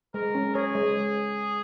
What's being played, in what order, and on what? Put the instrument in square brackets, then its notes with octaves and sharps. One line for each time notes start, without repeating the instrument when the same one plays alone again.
[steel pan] G#3 [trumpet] A#4
[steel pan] C#4
[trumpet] G#4 [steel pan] C#5
[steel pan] G#3